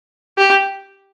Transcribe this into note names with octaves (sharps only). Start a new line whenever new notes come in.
G4